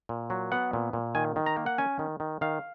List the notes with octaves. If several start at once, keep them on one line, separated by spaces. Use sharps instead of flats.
A#2
F#3
B3 F#5
A#2
A#2
D#3 G#5
D#3
A#5
A#3
F#5
C#4 G#5
D#3
D#3
D#3 F5